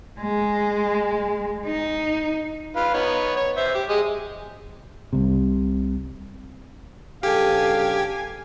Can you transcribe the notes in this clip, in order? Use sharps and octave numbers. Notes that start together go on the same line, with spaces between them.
G#3
D#4
F4 B4 F5
B3 D#4 C#5
C#5
C5 E5
G4
G#3 G4 D#5
C2 C3
G2 C#3 G4 A4 F5 G#5